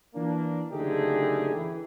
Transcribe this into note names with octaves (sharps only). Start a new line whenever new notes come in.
E3 A#3 D4
F#1 D3 A3 D#4 G4 G#4
E3